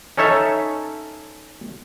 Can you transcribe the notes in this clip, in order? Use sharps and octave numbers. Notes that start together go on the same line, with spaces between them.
C#4 D#4 A4 C#5 E5